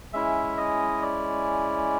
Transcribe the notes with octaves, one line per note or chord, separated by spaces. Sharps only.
G#3 C#4 E4 E5
D#5
D5